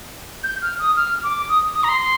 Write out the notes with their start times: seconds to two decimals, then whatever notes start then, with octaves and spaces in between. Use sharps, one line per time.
0.43 G6
0.62 F6
0.79 D#6
0.96 F6
1.23 D6
1.49 D#6
1.75 D#6
1.84 A#5
1.89 C6
2.01 C6